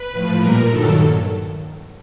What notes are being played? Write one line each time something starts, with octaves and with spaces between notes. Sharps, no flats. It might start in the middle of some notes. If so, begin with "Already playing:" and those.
Already playing: B4
A2 F3
A#2 G3 A#4
G2 D#3 F#3 A4